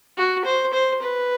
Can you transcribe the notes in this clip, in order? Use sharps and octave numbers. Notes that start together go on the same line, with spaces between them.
F#4
C5
C5
B4